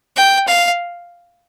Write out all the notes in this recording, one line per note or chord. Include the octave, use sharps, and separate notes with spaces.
G5
F5